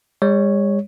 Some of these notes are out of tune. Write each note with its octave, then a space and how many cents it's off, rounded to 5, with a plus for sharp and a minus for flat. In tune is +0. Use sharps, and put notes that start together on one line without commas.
G#3 -45 C#5 +0